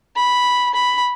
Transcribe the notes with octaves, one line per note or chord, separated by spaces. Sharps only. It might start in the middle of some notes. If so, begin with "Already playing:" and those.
B5
B5